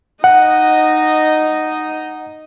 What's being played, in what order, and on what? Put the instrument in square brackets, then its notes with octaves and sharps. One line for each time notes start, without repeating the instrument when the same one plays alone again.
[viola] D#4 D#5 [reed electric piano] F#5